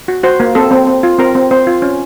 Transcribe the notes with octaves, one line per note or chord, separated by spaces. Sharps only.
F#4
F#4 C5
A#3
C4 A4
C4
C4
F4
C4 A#4
C4
C4 C5
F4
C#4